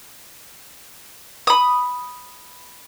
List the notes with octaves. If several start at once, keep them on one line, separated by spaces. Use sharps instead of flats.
B5 D#6